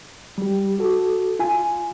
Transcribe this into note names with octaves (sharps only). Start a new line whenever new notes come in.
G3 G4
F#4 A4
F4 G#5